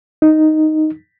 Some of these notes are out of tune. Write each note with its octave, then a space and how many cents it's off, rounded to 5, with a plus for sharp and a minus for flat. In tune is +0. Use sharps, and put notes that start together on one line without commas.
D#4 +0